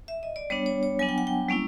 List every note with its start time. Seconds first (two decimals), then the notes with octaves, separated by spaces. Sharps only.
0.08 E5
0.23 D#5
0.36 D5
0.50 G3 B3 D4 C#5
0.66 C#5
0.83 C#5
0.99 F#3 B3 D4 G#5
1.09 G5
1.18 F#5
1.27 G5
1.49 G3 A#3 C#4 E4